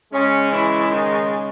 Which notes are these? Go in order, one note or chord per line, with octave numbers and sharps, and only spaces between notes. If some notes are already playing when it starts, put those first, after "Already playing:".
C#3 G#3 C#4
E3 E4
D#3 D#4